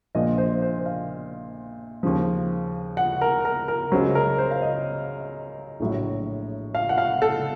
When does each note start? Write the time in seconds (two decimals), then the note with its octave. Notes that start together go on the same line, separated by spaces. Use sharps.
0.15 A#1 A#2 F3 D#5
0.38 C5
0.62 C5
0.86 F5
2.03 D#2 C#3 F3
2.97 F#5
3.21 A#4
3.45 A#4
3.68 A#4
3.92 C#2 C#3 F#3 C5
4.15 A#4
4.38 C5
4.51 F5
4.62 D#5
5.80 A#1 A2 F#3
6.75 F5
6.89 F#5
6.98 F5
7.22 A4